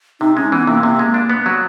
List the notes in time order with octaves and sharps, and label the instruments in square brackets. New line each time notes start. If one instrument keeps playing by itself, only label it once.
[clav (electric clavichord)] C3 [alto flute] D#4
[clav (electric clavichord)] G#3 [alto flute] C#4
[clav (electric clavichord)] E3 [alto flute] B3
[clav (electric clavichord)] C3 [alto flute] A#3
[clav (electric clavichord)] C3
G#3
D4
B3
F#3